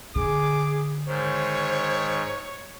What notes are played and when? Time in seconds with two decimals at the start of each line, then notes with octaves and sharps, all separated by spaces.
0.16 D3 G#4 D6
1.07 G#2 D#3 C5 C#5